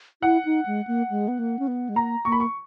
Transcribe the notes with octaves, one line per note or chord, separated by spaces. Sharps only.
E4 F#5
D#4
G#3
A#3
G#3
B3
A#3
C#4
B3
G#3
A#3 A#5
A#3 C#6
B5
C#6